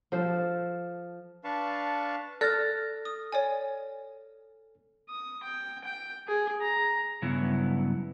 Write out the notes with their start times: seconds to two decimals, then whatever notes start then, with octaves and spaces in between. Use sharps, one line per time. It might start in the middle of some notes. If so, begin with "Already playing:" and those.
0.12 F3 A4 C5
1.44 D4 B4 F5 A5 C#6
2.41 A4 D5 F6 F#6 A6 A#6
3.05 D#6
3.32 C#5 D5 G#5
5.09 D#6
5.43 G5
5.84 G5
6.28 G#4
6.62 A#5
7.22 G2 C#3 F#3 B3 E4